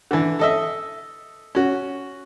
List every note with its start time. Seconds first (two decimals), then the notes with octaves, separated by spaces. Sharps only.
0.11 D3 E3
0.39 A4 D#5 E5
1.55 C#4 F#4